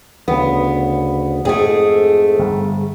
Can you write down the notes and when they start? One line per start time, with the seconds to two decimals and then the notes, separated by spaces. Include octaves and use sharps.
0.28 D2 C#3 B3
1.45 F2 G#2 A3 G#4
2.39 G1